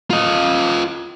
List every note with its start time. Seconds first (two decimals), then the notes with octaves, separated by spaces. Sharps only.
0.10 F4 D#5